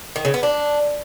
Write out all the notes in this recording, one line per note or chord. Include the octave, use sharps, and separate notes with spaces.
D#3
C#3
B3
D4